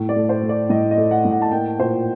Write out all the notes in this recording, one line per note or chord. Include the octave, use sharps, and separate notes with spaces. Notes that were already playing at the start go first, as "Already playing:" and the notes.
Already playing: A2
D5
A3
C5
A3
D5
A2 D#5
D#5
A3
F#5
A2
F#5
A5
A#3 G5
A#2 C5